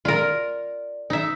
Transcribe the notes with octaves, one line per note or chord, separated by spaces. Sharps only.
F4 A#4 D5
D#4 E5